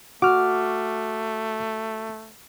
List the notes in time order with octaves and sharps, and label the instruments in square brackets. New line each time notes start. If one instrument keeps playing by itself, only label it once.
[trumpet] A3 [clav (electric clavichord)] F#4 [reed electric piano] D6 F6